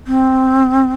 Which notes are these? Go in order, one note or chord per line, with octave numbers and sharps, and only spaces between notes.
C4